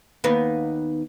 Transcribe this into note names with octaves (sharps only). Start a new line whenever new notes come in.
D#2 B3 D#4